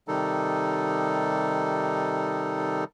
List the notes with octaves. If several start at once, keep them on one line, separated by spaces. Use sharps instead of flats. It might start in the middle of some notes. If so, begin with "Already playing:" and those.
C3 D#3 G3 D#4 A4